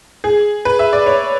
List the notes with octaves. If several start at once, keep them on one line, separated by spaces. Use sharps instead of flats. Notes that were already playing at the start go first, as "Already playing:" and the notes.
G#4
B4
E5
D5
C#5